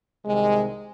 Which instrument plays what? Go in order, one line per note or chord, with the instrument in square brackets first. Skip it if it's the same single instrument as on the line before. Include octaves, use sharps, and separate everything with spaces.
[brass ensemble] C2 C3 D#3 G#3